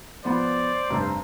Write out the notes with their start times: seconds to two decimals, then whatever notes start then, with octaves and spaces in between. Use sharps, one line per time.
0.25 F3 B3 B4 C5 D5
0.90 F1 G2 C4